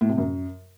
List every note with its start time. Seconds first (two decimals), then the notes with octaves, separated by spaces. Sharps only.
0.01 A2
0.09 C3
0.18 F#2